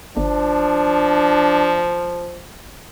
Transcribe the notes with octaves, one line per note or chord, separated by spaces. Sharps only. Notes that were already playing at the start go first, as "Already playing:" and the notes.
G1 F3 D4